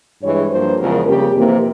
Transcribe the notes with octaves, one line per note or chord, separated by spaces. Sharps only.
G2 E3 G#3 C#5
G2 F3 A#3 C5
E2 C#3 F3 G#3 A#4
F2 C#3 G3 A#3 G4
F2 C3 E3 A#3